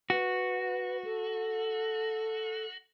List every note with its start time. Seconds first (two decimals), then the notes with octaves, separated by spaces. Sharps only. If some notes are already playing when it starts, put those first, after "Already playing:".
0.10 F#4 B4
1.04 A4